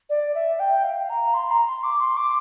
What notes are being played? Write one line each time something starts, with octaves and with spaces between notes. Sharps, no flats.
D5
E5
G5
F5
A#5
C6
A#5
C6
D6
C6
D6